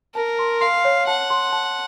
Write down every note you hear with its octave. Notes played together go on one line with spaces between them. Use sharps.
A#4 A5
C6
F5 C6
C#5
F#5 A5
C6
A5